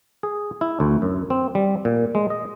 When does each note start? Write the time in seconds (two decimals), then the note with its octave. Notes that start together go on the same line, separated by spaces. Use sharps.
0.23 G#4
0.61 E4
0.80 D2
1.02 F#2
1.30 C4
1.55 G3
1.85 A#2
2.15 G#3
2.30 D#5